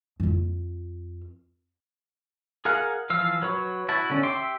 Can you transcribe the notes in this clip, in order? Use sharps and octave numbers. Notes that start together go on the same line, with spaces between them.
F2 F4
G#4 A#4 F5 F#5
E3 F3 F5 E6
F#3 B4 C#5
E4 F#4 A5
D3 C#4
G4 E5 C6 D6